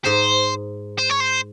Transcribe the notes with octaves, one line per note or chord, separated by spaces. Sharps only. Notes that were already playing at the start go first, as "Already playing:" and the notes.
G#2 C5
C5
C#5
C5